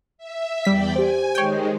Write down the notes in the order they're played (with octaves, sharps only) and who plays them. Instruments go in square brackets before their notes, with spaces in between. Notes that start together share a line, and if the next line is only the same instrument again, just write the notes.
[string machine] E5
[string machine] E2 D5 G5 [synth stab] G3 B6
[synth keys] G4 C5 [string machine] G#5
[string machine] D#3 G#3 [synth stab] C#5 G5